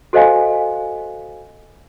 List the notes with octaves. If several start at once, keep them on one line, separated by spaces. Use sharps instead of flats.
F#4 A4 C5 D#5 F5 G#5